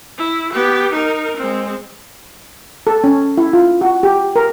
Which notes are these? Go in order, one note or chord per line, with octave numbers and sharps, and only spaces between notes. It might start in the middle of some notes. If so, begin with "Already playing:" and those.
E4
B3 G4
D#4 A#4
G#3 C4
A4
C#4
E4
F4
F#4
G4
A#4